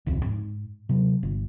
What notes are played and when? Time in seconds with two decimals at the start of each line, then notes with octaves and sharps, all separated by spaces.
0.06 D#1 C2 F2 C4
0.26 G#2
0.89 C3 F#3
1.23 G1